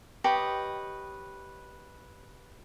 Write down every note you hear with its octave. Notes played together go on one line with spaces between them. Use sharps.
G4 B4 C#5 D#5